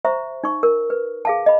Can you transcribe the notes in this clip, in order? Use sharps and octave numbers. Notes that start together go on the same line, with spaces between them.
C5 E5 A#5 C#6
D#4 C#6
A#4
B4
G#4 F5 A5
D#5 B5